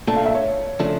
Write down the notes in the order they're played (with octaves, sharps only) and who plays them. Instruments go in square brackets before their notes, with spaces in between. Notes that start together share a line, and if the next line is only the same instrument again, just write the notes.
[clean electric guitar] A#2 A3 D4 [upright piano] A5
[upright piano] F5
E5
C#5
[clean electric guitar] C#3 F3 A3 D4